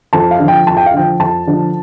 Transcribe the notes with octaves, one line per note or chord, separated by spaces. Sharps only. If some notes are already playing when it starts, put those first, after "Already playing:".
F2 A5
F5
D3
F3 G5
F2 A5
G5
F5
D3 F3 G5
F2 A5
D3 F3